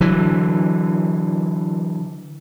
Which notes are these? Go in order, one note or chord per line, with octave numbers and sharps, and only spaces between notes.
D3 E3 F#3